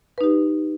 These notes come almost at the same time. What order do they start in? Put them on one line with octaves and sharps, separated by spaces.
B4 D#4 G4